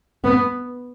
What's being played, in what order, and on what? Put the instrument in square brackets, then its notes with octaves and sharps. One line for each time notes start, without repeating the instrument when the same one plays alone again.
[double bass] B3